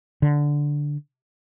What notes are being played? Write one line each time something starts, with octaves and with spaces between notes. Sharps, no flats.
D3